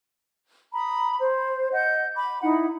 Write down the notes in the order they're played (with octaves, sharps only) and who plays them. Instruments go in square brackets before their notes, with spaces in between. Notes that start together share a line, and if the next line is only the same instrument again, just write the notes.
[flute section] A#5 B5 D#6
C5
D#5 F#5 G6
B5 D6
D#4 E4 F#5 B5